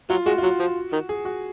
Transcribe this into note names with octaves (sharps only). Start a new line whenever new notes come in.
F#3 F4
G#3 F#4
F4
F#3 F#4
F3
D#3
G#4
F#4